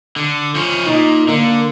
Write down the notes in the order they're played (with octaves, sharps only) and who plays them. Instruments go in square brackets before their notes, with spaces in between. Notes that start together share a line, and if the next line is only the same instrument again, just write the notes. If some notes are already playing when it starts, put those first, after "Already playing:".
[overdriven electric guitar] D3
F3 C#4
[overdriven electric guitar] A#2 [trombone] D#4
[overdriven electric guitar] D3 [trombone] A#3